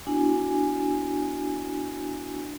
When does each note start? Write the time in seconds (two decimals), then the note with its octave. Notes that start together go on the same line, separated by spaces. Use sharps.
0.07 B3 D4 E4 F#4 G#5